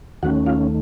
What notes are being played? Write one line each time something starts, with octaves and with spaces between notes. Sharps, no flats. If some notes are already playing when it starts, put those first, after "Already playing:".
D#2 D#3 A3 C#4 F#4 F#5
F4 F5